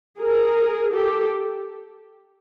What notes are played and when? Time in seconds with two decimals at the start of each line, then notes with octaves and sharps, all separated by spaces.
0.19 G#4 A#4
0.92 G4 A4